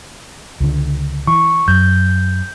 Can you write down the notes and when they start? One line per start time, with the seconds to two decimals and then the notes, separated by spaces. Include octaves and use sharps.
0.60 C#2 D3
1.27 E3 C#6
1.68 F#2 G6